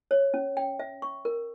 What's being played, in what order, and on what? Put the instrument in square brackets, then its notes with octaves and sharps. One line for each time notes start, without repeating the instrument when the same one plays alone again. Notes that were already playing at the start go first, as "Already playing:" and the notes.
[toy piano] C#5
C#4
G5
E5
C#6
A#4